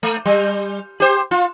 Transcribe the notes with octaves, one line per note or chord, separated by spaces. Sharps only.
A3
G3
G4 C5
F4